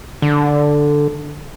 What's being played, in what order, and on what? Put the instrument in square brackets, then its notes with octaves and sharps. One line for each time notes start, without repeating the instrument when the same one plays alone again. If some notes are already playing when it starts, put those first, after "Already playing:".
[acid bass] D3